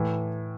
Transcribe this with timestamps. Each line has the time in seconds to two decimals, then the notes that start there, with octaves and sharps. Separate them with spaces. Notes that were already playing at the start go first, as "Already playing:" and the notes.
Already playing: A2 E3